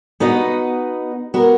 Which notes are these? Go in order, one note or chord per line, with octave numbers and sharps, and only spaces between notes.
B3 D#4 F#4 B4 D#5
B3 F#4 A#4